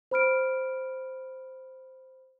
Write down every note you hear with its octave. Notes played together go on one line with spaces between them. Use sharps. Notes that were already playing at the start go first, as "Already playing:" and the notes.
C5 B5 F6 D7